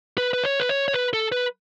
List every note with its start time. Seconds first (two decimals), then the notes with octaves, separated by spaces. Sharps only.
0.18 B4
0.33 B4
0.44 C#5
0.60 B4
0.69 C#5
0.88 C#5
0.94 B4
1.13 A4
1.32 B4